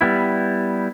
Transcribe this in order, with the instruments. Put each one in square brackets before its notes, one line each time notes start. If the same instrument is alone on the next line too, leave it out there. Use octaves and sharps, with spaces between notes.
[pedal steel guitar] G3 B3 E4